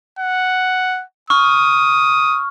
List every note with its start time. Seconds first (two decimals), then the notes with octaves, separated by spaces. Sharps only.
0.19 F#5
1.30 C#6 D#6 F6